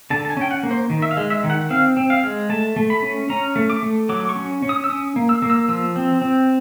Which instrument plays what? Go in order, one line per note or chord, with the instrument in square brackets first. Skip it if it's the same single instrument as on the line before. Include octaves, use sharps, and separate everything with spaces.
[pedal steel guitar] D3 A5
A5
G#5
C#4 G5
F#5
A#3
C5
D#3
E5
F5
G#3
E5
D#3
F#5
C4 F5
C4
F5
G#3
A3 A5
A3
B5
C#4
C#4 A#5
A3
D6
A3
F#3 D6
D6
C#6
C#4
C#4
D#6
E6
C#4 D#6
A#3
E6
A#3
E6
F3 E6
C4
C4